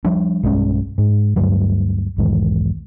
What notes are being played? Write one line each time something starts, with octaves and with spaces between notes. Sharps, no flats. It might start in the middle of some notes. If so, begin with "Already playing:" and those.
F3 G3 D4
B1 G2 G#3 C#4
G#2
D2 G2 F#3
B1 E2 G#2 D#3